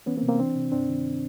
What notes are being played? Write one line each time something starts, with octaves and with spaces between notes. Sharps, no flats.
E3 B3 C#4
A#3 C4
C3
A#3 C4
E3 C4 D4
C3
G2 C4 D4
D#3